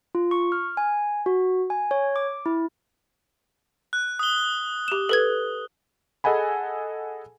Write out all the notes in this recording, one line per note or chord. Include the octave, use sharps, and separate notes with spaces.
F4
C#6
F6
G#5
F#4
G#5
C#5
D6
E4
F#6
D#6 G7
G4 E7
A4 B4 G#6
G#4 A4 D#5 F#5 G#5 B5